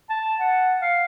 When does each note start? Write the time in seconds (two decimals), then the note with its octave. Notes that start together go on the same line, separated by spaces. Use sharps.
0.10 A5
0.39 F#5
0.82 F5